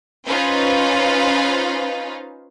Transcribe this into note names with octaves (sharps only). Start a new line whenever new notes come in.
C#4 D#4 F4 B4 C5 F5